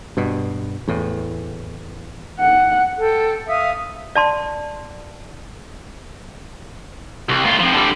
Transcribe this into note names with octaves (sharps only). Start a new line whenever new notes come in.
G2 B2
E2 A2
F#5
A4 G5
E5 F5 D#6
D5 A5 C6
C2
A2 F4
C3 F3
D3 G3